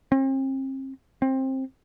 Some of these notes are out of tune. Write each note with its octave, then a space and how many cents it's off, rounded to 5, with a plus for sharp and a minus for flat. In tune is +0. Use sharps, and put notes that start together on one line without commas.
C4 +40
C4 +20